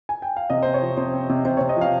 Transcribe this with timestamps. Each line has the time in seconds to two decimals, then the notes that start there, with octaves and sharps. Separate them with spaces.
0.09 G#5
0.22 G5
0.37 F5
0.50 C3 D#5
0.63 C4 C5
0.74 C#5
0.82 F3
0.97 C3 C5
1.14 C4
1.30 C3
1.45 C3 C5
1.57 C3 C#5
1.69 D#5
1.77 F3 F5